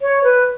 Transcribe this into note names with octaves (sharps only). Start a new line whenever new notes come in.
C#5
B4